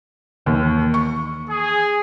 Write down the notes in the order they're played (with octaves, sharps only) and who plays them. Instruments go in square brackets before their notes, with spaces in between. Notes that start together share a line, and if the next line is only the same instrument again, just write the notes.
[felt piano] D#2 [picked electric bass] D#3 E3 A#3
[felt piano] C#6
[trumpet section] G#4